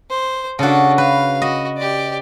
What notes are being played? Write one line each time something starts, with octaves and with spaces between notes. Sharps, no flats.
C5
C#3 D4 F#4 A4
B4 F5
F#4 D#5
G4 D5